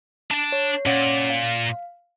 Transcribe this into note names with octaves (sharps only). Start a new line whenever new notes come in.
D4 A5
C#5
A#2 C#4 C#5 F#5
F5